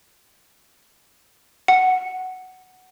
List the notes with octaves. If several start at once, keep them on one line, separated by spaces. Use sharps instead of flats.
F#5